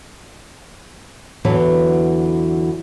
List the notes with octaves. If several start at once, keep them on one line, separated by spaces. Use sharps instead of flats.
E2 D3 E3 F#3 B4 A5